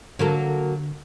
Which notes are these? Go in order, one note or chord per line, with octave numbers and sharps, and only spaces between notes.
D3 F#3 A#3 A4